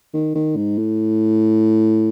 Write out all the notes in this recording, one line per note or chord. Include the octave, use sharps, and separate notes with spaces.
D#3
D#3
G#2
A2